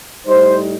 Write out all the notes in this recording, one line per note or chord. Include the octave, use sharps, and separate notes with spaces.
A2 G3 D#4 C5